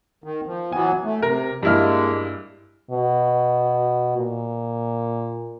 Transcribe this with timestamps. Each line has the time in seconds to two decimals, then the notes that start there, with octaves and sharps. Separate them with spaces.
0.24 D#3
0.46 F3
0.72 E3 F#3 B3 G#5
1.05 A3
1.22 C3 A#4
1.63 G2 G#3 A#3 E4 F6
2.91 B2
4.17 A#2